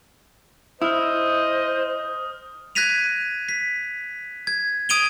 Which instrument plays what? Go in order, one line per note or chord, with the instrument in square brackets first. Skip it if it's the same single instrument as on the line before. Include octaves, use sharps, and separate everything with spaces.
[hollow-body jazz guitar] E4 [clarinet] C5 [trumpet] D#5 [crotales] D#6 F6
[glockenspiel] F#6 G#6 A#6 B6 D#7 F7
B6
G#6
D#6 G#6 D7 D#7 F7 G7